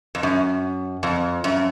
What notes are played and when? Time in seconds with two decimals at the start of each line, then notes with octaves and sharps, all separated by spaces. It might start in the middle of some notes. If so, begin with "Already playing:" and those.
0.15 F2
0.23 F#2
1.03 F2
1.44 F#2